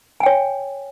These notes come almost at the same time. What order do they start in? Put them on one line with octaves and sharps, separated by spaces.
G#5 G5 C#5